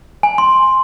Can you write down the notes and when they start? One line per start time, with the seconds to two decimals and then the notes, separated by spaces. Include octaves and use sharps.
0.23 G#5
0.38 C6